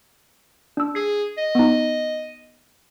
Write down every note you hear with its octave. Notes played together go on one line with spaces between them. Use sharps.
D4 E6
G#4 C7
D#5
B3 D#4